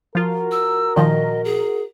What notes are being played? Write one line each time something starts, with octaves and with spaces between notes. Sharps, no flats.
F3 F4 F#4 A#4
E6
A#2 D#3 F3 D#5
G#4